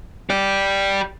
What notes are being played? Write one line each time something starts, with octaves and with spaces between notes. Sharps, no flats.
G4 D5